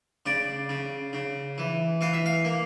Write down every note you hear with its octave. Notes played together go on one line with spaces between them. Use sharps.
C#3 D5
C#3
C#3
E3
E3 F5
E5
F5
A#3